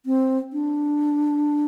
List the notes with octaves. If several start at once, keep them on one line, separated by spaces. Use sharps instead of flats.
C4
D4